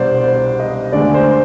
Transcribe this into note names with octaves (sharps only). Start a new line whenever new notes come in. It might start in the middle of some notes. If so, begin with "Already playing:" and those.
Already playing: C2 B2 G3 D4 C5 D5
C5
D#5
D2 D3 G#3 D4 D5
C5